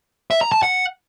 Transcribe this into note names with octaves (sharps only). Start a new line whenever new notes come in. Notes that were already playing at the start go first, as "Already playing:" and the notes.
E5
A#5
A5
F#5